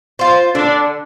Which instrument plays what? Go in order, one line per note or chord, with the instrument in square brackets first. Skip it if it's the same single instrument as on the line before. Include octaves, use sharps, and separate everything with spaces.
[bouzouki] F4 C5
[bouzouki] D3 [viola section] D4